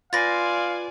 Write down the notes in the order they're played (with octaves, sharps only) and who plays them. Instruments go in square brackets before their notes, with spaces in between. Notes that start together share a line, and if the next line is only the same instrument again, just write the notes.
[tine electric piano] F4 B4 C6 [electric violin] D5 G#5 [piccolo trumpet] F5 [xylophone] A6 A#6